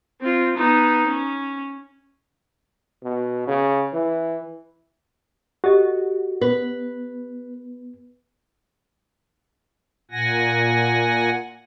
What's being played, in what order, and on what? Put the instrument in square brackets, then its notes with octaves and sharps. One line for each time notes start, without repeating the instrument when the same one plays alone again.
[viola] C4 F4
B3 D#4
C#4
[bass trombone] B2
C#3
E3
[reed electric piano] F#4 [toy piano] G4 A4 D#5
[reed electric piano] B3 [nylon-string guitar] B4
[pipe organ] A#2 F#5 G#5 A#6